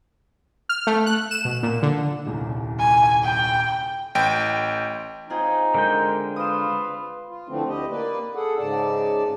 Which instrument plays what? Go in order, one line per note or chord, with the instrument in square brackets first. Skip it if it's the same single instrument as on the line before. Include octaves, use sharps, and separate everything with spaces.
[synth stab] F6
A3
F#6
E7
B2
A#2
D3
[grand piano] D#1 C2
[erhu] G#5
G5
[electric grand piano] A1 G5
[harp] C4 F4 G#4 [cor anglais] D#4
[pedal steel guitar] D3 G#3 G5 [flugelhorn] A#4
[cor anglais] F4 [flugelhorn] B4 [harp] D#6 E7
[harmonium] F4
D3 E3 F3 A3 C4
D2 E4 G4 D#5
A#3 B4 D5
G#4 A4 F#5
G#2 C#3 D5 A5